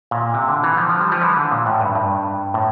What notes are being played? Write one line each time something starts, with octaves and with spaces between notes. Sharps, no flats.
A#2
C3
D3
E3
F3
F3
G3
F3
E3
D3
A#2
A2
G2
G2
A2